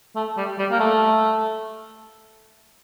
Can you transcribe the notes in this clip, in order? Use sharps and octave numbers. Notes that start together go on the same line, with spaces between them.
A3
G3
G3
A#3
A3